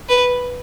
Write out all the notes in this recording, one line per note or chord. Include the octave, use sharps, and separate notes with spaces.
B4